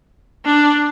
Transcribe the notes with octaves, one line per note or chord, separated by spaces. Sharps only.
D4